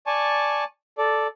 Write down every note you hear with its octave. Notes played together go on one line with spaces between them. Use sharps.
D5 G#5 A5 C#6
A4 D5